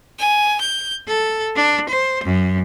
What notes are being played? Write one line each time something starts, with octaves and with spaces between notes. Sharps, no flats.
G#5
G6
A4
D4
C5
F#2